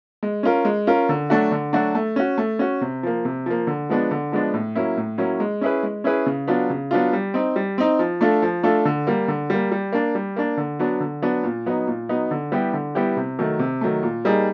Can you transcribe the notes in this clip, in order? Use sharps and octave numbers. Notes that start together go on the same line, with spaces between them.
G#3
C#4 F4 A#4
G#3
C#4 F4 A#4
D3
F#3 A3 D4 F#4
D3
F#3 A3 D4 F#4
A3
C#4 F#4
A3
C#4 F#4
C3
F3 A#3
C3
F3 A#3
D3
F3 G#3 B3 D4
D3
F3 G#3 B3 D4
A2
F#3 A#3 C#4 E4
A2
F#3 A#3 C#4 E4
G#3
C#4 E4 G#4 B4
G#3
C#4 E4 G#4 B4
C#3
F#3 B3 D4 F4
C#3
F#3 B3 D4 F4
G3
C4 D#4
G3
C4 D#4
F3
A3 D4 F4 A4
F3
A3 D4 F4 A4
D3
G3 A#3
D3
G3 A#3
G3
A#3 D4
G3
A#3 D4
D3
F#3 B3 D4
D3
F#3 B3 D4
A#2
F#3 B3 D#4
A#2
F#3 B3 D#4
D3
G3 B3 E4 G4
D3
G3 B3 E4 G4
C3
D#3 F#3 A3
C3
D#3 F#3 A3
A#2
G3 A#3 D#4 G#4